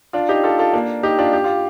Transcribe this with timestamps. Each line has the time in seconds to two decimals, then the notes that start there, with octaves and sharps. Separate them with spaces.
0.13 D4 F4
0.29 D#4 G4
0.44 F4 A4
0.59 F4 A4
0.73 A#3 D4
1.03 D#4 G4
1.19 D4 F4
1.33 G4
1.44 F4